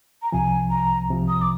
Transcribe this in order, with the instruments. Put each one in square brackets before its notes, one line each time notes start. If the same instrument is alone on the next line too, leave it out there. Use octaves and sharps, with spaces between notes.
[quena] A#5
[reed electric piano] C2 C3 F3 [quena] G#5
[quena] A#5
[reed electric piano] C2 C3 F3
[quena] D#6
D6